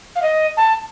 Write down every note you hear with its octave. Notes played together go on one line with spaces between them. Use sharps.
F5
D#5
A5